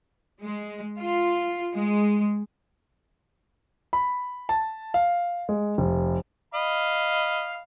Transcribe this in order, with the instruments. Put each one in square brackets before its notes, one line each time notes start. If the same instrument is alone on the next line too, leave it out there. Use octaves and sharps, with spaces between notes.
[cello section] G#3
F4
G#3
[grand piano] B5
A5
F5
G#3
F1
[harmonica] D#5 F5 B5